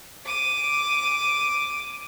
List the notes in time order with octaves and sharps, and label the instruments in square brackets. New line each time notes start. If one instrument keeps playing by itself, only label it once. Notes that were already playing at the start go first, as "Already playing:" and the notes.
[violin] D6 D#7